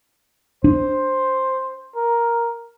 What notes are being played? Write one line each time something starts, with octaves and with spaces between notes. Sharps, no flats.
D4 C5
A#4